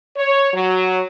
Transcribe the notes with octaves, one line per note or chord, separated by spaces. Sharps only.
C#5
F#3